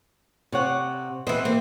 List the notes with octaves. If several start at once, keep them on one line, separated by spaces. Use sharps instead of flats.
C3 C#5 F#5
E3 B3 C4 D#5
A#3 C4